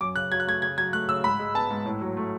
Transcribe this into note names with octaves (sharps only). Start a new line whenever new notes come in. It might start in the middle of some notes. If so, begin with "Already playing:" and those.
F#2 D6
C#3 F#6
F#3 G#6
F#6
A3 G#6
C#3 G#6
F#3 G#6
A3 F#6
C#3 E6
G#2 B5
G#3
B3 A5
G#2
A2
F#3
A3